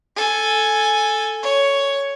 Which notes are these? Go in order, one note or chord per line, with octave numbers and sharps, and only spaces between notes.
A4 G#5
C#5